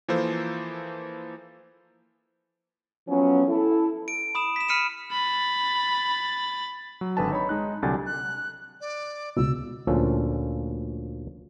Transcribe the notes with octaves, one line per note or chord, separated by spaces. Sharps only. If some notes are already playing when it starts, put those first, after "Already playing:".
E3 F3 A#3 A4 C5
F3 F#3 B3 C#4
E4 A4
D7
B5 D#6 E7
B6 E7
B5 F6 B6 C#7 D#7 E7
B5 A6
F#3
G#1 D3 B4 G#5 A5
D#4 C#5 B5
G#3 D#4 F#6
C2 D3 F#3 G4 G#5 A6
F#6
D5
C#2 B2 E6
D2 A#2 F3 C#4 A4